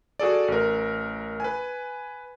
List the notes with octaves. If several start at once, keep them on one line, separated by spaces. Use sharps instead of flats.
F#4 G#4 A4 D5
A1 A#4
B4 G#5